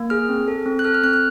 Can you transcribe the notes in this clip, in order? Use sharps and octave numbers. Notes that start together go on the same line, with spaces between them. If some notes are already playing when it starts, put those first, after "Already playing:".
Already playing: A#3
G#4 F6
C4
A4
C4
F#6
A4 F6
F6
C4 F#6
F6